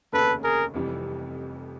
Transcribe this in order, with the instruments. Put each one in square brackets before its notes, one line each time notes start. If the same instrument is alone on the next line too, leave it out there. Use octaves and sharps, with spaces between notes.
[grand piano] F1 D#2 C#3 [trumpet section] A4 B4
[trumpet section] G#4 A#4
[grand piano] F1 F2 C3 E3 G3